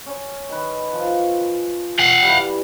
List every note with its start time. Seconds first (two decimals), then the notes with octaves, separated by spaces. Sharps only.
0.06 C#4 C#5
0.49 D#3 B4
0.93 F3 F4
1.99 F5 F#5
2.22 E3 G3